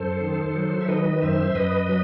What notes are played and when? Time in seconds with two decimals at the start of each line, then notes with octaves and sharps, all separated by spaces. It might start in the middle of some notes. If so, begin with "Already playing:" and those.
Already playing: F#2 A4 C5
0.21 D#3
0.55 F#3
0.81 E5
0.88 D#3 B4 D#5
1.22 F#2 C5 E5
1.55 F#2 B4 D#5
1.89 F#3